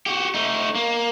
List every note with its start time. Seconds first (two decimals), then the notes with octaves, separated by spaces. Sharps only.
0.06 F#4 G4
0.34 A3 D#4
0.75 A#3